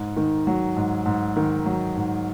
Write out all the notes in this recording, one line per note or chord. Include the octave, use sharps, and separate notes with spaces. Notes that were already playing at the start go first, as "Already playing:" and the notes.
Already playing: G#2
D#3
F#3
G#2
G#2
D#3
F#3
G#2